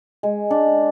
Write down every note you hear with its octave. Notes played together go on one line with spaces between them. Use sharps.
G#3
D4